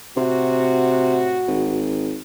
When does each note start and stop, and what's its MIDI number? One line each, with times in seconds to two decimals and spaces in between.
0.17 1.85 45
0.17 1.38 48
0.17 1.85 66
1.47 2.19 32